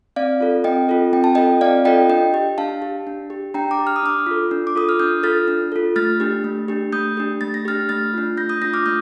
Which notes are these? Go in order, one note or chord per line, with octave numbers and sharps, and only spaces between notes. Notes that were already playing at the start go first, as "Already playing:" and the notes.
C4 D5 F5
F4 A4
C4 D#5 G5
F4 A4
C4 G5
A5
F4 A4 D#5 G5
C4 D5 F5
F4 A4 D#5 G5
D4 D#5 G5
G4
D4 F5 A5
G4
D4
G4
D4 G5 A#5
A#5 D6
G4
F6
D#6
D4 D6 F6
F4 A4
D4
D6
F4 A4 D#6
F6
D4 D#6 G6
F4 A4 F6 A6
D4
F4 A4
A3 F6 A6
D4 G4
A3
D4 G4
A3 D#6 G6
D4 G4
A3 A6
A#6
D4 G4 F6 A6
A3 F6 A6
D4 F4
A3 G6 A#6
D#6 G6
D4 F4 G6 A#6
D6 F6
A3 D#6 G6